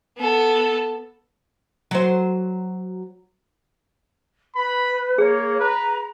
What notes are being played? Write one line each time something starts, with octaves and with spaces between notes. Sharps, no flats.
B3 A4
F#3 C5
B4 B5
A#3 G#4 C#5
B4 A#5